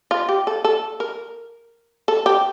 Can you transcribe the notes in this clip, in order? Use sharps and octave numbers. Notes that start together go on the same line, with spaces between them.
F4
G4
A4
A4
A#4
A4
G4